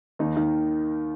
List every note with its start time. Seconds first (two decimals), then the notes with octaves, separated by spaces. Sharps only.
0.19 D#2 D#4
0.37 D#3